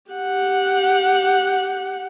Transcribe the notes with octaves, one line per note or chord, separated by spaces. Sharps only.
G4 F#5